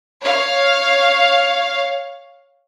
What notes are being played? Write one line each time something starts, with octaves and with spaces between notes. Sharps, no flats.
C#5 F5